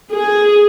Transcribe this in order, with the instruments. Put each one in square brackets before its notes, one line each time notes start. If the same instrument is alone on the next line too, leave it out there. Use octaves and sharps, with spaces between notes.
[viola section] G#4